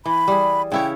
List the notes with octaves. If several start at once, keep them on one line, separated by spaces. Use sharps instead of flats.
E3 B5
G3 G#4
C#3 E4 C#5 G5